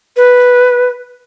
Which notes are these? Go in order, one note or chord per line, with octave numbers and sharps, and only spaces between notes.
B4